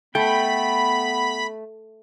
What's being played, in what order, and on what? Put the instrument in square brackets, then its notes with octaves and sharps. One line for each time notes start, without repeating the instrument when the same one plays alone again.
[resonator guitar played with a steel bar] A3 [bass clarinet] B3 [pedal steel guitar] G5 [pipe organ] B5